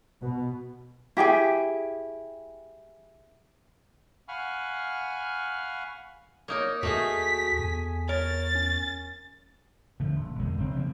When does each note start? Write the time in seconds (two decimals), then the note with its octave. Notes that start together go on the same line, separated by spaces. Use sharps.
0.21 B2
1.17 E4 G4 G#4 G5
4.28 F5 F#5 G#5 B5 C#6 F6
6.48 A#3 D#4 A#4 C#5
6.83 D#2 A3 D#4 F#4 G#4 B6
7.59 E2 G#5
8.09 A#4 C#5 A6
8.55 C#4
10.00 D3 F3 A3
10.16 D#1
10.39 B1 F2 D#3 G#3
10.58 F#1 F#3 C4
10.75 C#3 F3 G3 A#3